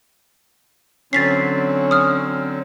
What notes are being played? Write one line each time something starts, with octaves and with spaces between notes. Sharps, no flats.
D3 F#3 C4 C#4 A6 B6 C7
D#6 F6